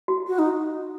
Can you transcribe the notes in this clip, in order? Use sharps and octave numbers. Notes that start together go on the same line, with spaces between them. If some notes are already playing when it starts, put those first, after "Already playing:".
F#4
F#4
D#4